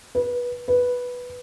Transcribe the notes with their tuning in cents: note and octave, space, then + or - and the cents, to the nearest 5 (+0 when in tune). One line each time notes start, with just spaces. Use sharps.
B4 -20
B4 -5